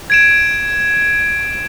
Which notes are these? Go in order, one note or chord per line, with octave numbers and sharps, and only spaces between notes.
G#6 D7 E7